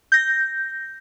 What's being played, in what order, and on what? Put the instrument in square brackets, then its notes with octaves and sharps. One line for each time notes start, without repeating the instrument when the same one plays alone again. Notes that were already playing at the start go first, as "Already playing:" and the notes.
[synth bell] G6 A#6